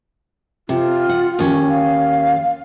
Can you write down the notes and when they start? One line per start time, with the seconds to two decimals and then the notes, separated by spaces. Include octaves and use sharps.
0.69 C3 F4
1.09 F#5
1.39 D#2 C#4
1.70 F5